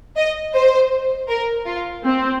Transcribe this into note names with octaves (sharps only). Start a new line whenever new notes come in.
D#5
C5
A#4
F4
C4